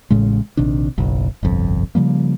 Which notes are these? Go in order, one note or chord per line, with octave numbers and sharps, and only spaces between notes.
A1 A2 C#3 G#3
A#1 C3 D#3 D4
F#1 B1
G1 C2 F2
C#3 F3 G3 A#3